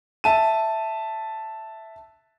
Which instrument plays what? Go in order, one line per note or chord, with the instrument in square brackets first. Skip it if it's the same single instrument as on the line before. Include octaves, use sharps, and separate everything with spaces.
[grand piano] E5 A5 D#7